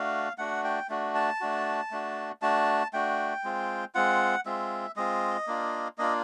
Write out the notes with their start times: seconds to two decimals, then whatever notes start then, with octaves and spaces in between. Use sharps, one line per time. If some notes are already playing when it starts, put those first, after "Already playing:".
Already playing: A3 D4 F#4 F5
0.38 A3 D4 F#4 F#5
0.64 G5
0.90 A3 D4 F#4
1.15 A5
1.40 A3 D4 F#4
1.91 A3 D4 F#4
2.42 A3 D4 F#4 A5
2.93 A3 D4 F#4 G5
3.44 G#3 C4 F4
3.95 G#3 C4 F4 F#5
4.46 G#3 C4 F4 E5
4.96 G#3 C4 F4 D#5
5.47 A#3 D4 F4
5.98 A#3 D4 F4 D#5